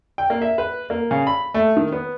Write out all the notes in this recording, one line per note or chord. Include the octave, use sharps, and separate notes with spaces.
G5
A#3
E5
B4
A#3
C#3
B5
A3
D#3
B3